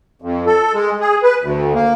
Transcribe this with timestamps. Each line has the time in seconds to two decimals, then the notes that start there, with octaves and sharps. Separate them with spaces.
0.22 F2
0.46 A4
0.74 G#3
1.01 G#4
1.23 B4
1.42 D2
1.74 A#3